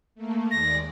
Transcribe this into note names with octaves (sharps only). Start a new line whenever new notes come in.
A3 A#3
D#2 G#3 D5 A#6